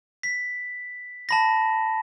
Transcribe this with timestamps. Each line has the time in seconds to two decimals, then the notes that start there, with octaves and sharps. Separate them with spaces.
0.23 B6
1.29 A5 B5 A#6